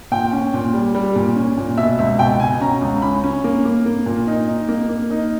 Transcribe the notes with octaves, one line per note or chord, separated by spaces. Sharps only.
A#2 G5
C#4
A#2
G3
G3
A#2
C#4
A#2
B2 E5
C#2 E5
B2 G5
B2 G#5
C#4 A#5
C#2
C#4 B5
C#4
A#3
A#3
A#3
A#2
D#4
D#4
A#3
A#3
D#4